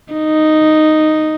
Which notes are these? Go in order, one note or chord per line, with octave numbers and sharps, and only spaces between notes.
D#4